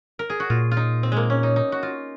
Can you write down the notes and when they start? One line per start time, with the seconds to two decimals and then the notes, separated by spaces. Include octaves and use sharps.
0.19 A#4
0.30 G#4
0.40 F#4
0.50 A#2 F4
0.72 F4
0.77 D#4
1.03 C4
1.12 G#3 A#3
1.30 C#4
1.43 D#4
1.56 D#4
1.72 F#4
1.83 F4